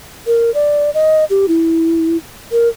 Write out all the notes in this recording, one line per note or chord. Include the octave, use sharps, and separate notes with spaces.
A#4
D5
D#5
G4
E4
A#4